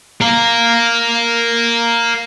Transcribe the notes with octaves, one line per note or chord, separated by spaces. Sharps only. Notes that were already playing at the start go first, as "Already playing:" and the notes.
A#4 F5